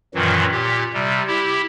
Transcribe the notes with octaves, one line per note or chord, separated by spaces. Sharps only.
F#2 A#2 D#3 E3 F#3
A#2 G4
C3 G3
E4 G4